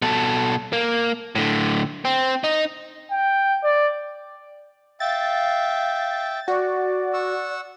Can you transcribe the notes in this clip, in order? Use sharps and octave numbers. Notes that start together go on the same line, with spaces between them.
B2 A4
A#3
A2 D3
C4
D#4
G5
D5
E5 F5 G5 A6
F#4 D5
F#5 C#6 E6